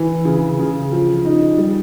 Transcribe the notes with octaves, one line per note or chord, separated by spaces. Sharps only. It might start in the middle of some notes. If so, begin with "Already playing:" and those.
Already playing: E3
C#3
C#3
F3
D#4
G3